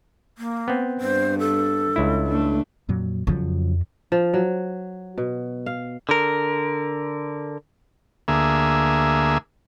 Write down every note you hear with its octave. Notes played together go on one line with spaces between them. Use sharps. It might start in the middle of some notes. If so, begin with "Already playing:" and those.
A#3
B3 C4
G2 C5
A4
C#2 E4
A3 D4
F2 A#2 F#3
F2 C#3 F3 F#3
F3
F#3
B2
F5
D3 A#4
D2 A#3 G#4 E5